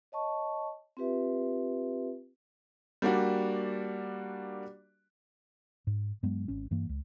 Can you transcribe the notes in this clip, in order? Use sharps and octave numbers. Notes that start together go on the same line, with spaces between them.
C#5 D#5 A5 C#6
C4 F4 G4 B4 E5
G3 A#3 D4 F#4
G#2
G2 F#3 G#3 B3
G#1 C#4
G2 E3 A#3
C#2